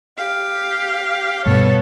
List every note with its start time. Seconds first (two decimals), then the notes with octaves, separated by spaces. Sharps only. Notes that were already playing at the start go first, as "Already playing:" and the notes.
0.17 G4 F5
1.46 G2 B2 G3 B3 A4 C#5